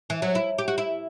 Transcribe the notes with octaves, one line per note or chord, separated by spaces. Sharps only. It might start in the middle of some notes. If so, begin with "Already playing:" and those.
E3
F#3
E4
G4
F#4
E4